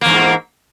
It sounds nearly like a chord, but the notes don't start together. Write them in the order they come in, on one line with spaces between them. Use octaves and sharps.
A#3 E2 G#2